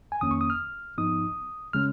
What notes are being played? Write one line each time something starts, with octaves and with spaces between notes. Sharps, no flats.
G#5
F2 D#3 A#3 C#4 D#6
C#6
D#6
F6
G#2 F3 B3 D#4 D#6
C#3 G#3 C#4 F6